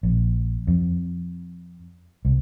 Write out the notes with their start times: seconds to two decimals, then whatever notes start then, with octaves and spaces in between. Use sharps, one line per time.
0.03 A#1
0.67 F2
2.25 C2